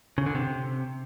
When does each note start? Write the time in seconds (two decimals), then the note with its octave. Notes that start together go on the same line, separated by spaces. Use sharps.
0.18 C#3
0.26 D3
0.35 C3